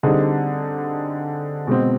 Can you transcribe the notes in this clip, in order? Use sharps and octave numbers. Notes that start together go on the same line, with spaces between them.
D3 G3 C4 D#4 G#4
B2 G#3 C4